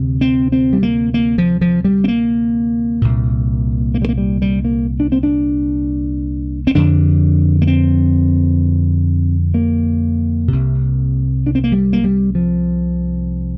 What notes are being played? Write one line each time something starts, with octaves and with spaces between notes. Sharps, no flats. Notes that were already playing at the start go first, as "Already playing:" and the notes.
Already playing: D2 C3
C4
C4
G3
A#3
A#3
F3
F3
G3
C4
A#3
C2 A#2
A#3
G3
A#3
G3
G3
A#3
D4
C4
D4
C4
F2 D3 D4
A#3
C4
A#3
C2 C3
D4
C4
A#3
G3
A#3
G3
F3